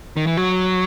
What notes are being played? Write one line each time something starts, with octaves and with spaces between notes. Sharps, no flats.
D#3
E3
F#3